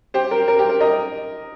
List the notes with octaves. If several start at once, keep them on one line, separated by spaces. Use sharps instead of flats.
G4 C5
A#4
A#4
G4
A#4
A#4 D#5